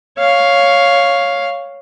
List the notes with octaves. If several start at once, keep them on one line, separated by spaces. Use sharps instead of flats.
C#5 F5